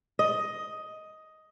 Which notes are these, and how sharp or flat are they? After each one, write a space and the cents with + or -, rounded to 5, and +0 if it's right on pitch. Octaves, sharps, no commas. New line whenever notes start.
D#5 +10